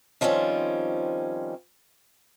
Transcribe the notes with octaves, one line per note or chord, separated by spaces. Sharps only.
D#3 F3 G3 C4 C#4